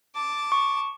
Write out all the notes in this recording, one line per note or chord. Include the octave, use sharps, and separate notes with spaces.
A5 D6
C#6